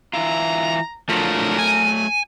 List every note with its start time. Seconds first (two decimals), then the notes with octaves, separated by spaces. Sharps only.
0.13 E3 E4 F4 A#5
1.09 D3 F3 F#3 A3 A#4
1.58 G#5